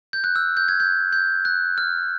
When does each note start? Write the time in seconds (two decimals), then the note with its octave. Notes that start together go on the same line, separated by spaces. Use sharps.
0.13 G6
0.24 F#6
0.36 E6
0.57 G6
0.68 G#6
0.80 G6
1.13 G6
1.45 F#6
1.78 F6